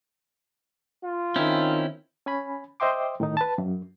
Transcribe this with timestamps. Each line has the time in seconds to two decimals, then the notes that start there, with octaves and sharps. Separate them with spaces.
1.04 F4
1.36 D#3 C4 C#4 E4
2.26 C#4 G#5 B5
2.80 C5 D#5 E5 G5 C6 D6
3.20 A2 D#3 D#4
3.37 B4 A5
3.58 F#2